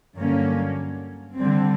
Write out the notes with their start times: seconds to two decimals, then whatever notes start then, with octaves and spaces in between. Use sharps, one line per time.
0.15 G2 D3 F#3 A#3 C#4
1.36 D3 G3 C4